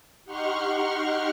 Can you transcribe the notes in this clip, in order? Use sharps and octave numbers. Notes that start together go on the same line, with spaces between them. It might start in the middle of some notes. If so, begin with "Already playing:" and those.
D#4 G4 F#5 C6 C#6 F6